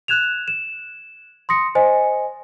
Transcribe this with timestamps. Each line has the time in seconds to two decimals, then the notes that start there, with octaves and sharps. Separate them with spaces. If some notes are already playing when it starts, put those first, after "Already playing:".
0.08 F#6 G#6 E7 F7
0.48 E7
1.49 C6 D#6 A#6 C#7
1.75 C5 D#5 G#5